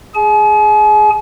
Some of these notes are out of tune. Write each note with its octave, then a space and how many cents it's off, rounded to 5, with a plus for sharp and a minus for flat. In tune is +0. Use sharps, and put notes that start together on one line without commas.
G#4 +0 G#5 +45